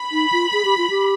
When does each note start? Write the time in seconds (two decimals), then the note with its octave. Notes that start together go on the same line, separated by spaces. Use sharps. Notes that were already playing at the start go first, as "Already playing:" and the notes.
Already playing: B5
0.12 D#4
0.32 F4
0.53 G#4
0.65 G4
0.78 F4
0.90 G4